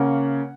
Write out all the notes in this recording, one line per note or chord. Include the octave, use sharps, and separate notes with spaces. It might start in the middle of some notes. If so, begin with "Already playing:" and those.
Already playing: C#3 A#3 C#4 F#5